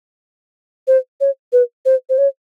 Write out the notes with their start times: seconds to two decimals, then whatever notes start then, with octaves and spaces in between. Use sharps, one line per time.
0.87 C5
1.21 C#5
1.53 B4
1.85 C5
2.09 C5
2.18 C#5